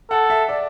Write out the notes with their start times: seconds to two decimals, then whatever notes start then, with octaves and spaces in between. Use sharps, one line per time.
0.10 A4 F#5
0.30 E5
0.49 D5